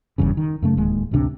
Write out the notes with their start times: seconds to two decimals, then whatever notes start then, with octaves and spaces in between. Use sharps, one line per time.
0.18 F#1 E2 G2 C#3
0.37 D#3
0.62 F#2 C#3 A3
0.77 D1 D#2 G#3
1.11 A1 D2 C3 D4